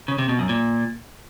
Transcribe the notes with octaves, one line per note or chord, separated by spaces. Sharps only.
C#3
C3
B2
F#2
A#2